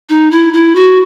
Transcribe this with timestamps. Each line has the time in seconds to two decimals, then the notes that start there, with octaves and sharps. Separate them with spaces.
0.09 D#4
0.31 E4
0.53 E4
0.75 F#4